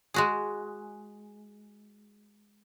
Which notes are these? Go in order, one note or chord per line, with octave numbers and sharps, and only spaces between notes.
G#3 F#4 G#4